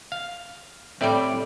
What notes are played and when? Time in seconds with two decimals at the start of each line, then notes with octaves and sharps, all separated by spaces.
0.12 F5
1.01 A2 G3 C4 E4 D5